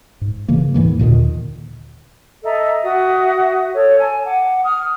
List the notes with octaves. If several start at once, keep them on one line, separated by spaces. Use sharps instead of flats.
G#2
C#3 E3 A#3
D#2 G#2 E3 A#3
D#2 A#2 D3 D#3
A4 D#5 E5 A#5
F#4 E5 D#6
A4 C#5
G#5 A5
F#5 D6
D#6 F6